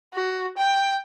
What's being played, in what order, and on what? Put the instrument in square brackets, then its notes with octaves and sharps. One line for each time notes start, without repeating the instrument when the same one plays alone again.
[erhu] F#4
G5